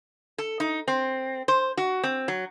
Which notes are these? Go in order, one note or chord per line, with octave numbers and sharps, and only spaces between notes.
A4
D#4
C4
C5
F#4
C4
F#3